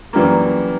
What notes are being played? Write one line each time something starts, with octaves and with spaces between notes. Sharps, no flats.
F#2 E3 G3 A#3